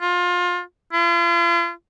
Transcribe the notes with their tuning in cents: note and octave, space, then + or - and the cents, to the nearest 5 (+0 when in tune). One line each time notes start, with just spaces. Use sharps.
F4 +25
F4 -40